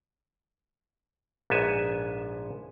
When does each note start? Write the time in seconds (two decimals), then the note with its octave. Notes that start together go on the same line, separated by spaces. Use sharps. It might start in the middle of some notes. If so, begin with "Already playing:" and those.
1.50 A#1 G#2 B3 E5 G#5